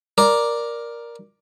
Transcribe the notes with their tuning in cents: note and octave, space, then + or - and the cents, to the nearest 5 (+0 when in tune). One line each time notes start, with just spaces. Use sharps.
A#4 +10 D5 +0 D6 +0